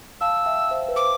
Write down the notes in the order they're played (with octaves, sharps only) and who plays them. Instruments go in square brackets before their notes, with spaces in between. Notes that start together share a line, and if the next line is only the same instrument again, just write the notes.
[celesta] F5 A5 [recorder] E6
[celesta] E5 G5
C5 E5
B4
[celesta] C5 [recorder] D6